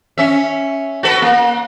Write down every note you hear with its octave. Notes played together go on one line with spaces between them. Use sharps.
C#4 E5
F#4 A4 B4
A#3